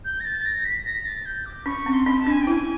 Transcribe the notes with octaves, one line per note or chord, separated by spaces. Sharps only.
G6
A#6
A6
A#6
B6
A#6
A6
G6
D6
C#4 C#6
C4
C6
C#4
A5
D4
G#5
G5
E4
G#5